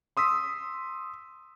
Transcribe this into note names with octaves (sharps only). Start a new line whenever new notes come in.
C6 D#6 E6 B6